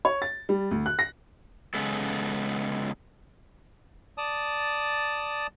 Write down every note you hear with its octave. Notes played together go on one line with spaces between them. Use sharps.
C#5
A6
G3
D2
F#6
A#6
C#3 G#3 B3 A4
D5 A5 D#6